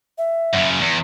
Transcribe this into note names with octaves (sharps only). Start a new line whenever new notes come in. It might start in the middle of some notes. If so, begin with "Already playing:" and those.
E5
F#2 C#3
E2